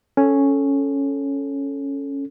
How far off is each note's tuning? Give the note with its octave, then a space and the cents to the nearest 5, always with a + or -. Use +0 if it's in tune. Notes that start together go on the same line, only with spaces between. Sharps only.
C#4 +0 A4 -5